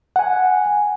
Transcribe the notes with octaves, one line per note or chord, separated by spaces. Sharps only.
F#5 G#5